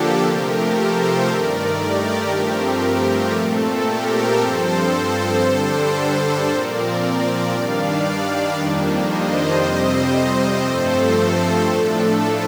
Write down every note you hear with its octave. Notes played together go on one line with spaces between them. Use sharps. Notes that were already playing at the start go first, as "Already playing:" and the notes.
Already playing: D3 F3 A#3 D4 G4 A4
C3 F3 A3 G4 A#4
A4 C5
G2 D#3 A3 A#4 D5
G4 A#4
G2 F3 A3 C4 G4 A#4
G4
A#2 A3 C4 A4
G4 A#4
G2 F3 C4 A4 C5
A4 C5
G2 D3 G3 D4
A#2 F3 C4 A#4 D5
G2 D#3 G3 D4 D5 F5
D5 F5
F2 D#3 G3 A#3 D4
C5 D#5
F2 C3 G3 C4
G2 F3 A3 C4 A4 C5
A4
A2 F3 A3 D4